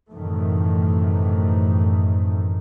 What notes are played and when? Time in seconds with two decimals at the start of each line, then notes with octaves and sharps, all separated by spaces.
0.11 F#2 A2 C3 D#3 E3 A3